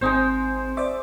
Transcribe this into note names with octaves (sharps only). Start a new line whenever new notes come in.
G#1 G#3 C4 D#4 C5
C5 D5 E5 D6